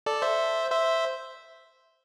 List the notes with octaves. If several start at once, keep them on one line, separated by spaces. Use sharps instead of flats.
A4 D5
C5 E5
C5 E5